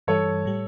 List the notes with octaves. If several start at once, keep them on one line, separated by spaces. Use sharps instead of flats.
G2 E3 G3 A4 C#5
A2 G3